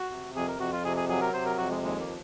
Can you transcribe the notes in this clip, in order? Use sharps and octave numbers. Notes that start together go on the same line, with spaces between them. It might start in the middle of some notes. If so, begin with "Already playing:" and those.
Already playing: F#4
C3
F2 G#4
A#4
F2 F#4
F4
C3 G#4
G#4
F#3 G#4
A#4
C3 C5
A#4
F2 F#4
G#3
D#2 G#3
A#3
F3